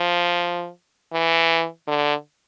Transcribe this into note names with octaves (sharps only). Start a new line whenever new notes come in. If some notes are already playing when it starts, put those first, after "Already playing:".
Already playing: F3
E3
D3